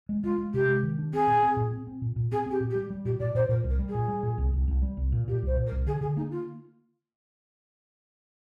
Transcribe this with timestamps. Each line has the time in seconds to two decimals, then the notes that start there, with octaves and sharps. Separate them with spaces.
0.09 G#3
0.23 G#3 F4
0.38 G#3
0.54 C3 G4
0.69 G#3
0.83 D#3
0.98 D4
1.13 C4 G#4
1.27 A#2
1.43 C4
1.57 A#2
1.71 C4
1.87 C4
2.02 A#2
2.16 A#2
2.31 C4 G#4
2.46 C4 G4
2.60 A#2
2.70 G4
2.75 G3
2.90 G3
3.05 A#2 G4
3.19 A#2 D5
3.35 A#2 C5
3.49 A#2 A#4
3.64 C2
3.69 A#4
3.79 G3
3.88 G#4
3.95 A#2
4.08 G3
4.23 A#2
4.38 C2
4.53 C2
4.68 C2
4.82 G3
4.97 C2
5.12 A#2
5.28 A#2 G4
5.42 C2 C5
5.56 A#2
5.66 A#4
5.71 C2
5.86 D3 G#4
6.01 D3 G#4
6.16 A#3 D#4
6.31 F4